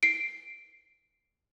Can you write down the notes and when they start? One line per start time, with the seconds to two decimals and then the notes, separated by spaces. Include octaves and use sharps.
0.03 C7 D7